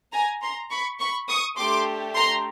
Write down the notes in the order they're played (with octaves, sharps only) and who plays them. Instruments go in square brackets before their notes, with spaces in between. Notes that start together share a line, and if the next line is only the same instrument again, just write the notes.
[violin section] G#5 A#5
A#5 C6
B5 C#6
B5 C#6
C#6 D#6
A3 D4 G4 C6 D6
A#5 C6